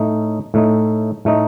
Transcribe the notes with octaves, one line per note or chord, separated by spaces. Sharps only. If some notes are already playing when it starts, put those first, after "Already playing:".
Already playing: A2 A3 D#4
A2 A3 D#4
A2 A3 D#4